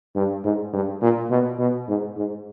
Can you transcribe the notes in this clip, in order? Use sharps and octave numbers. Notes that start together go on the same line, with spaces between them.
G2
G#2
G2
A#2
B2
B2
G#2
G#2